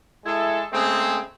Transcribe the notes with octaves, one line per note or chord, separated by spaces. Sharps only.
G#3 E4 A4
C#3 G#3 A3 C4